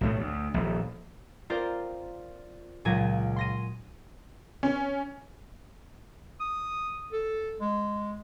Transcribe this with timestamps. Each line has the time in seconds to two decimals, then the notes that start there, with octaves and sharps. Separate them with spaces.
0.01 B1 A2 A3
0.19 D2
0.54 D#1 A#1
1.50 C4 F4 A#4 C5 D5
2.85 C#2 A#2 F#3 G#5 A#6
3.36 C6 A#6 D#7
4.63 C#4
6.40 D#6
7.12 A4
7.61 G#3